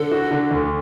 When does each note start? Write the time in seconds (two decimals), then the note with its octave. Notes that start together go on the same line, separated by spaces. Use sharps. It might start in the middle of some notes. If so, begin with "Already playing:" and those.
Already playing: D3 A4
0.11 F#4
0.31 D3
0.51 D2